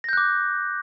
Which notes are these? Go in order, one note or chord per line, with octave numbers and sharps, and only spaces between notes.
D6 F#6 G6 A#6